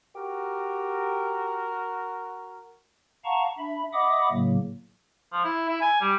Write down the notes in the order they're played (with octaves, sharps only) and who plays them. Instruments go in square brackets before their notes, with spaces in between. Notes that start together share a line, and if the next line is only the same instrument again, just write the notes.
[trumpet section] F#4 A#4 [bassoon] G4
[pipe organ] F5 F#5 A5 A#5 C#6
D4 E5 B5
D#5 E5 F#5 B5 D6 D#6
A2 C#3 F#3 A#3
[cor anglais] F3
E4
E4
G#5
G3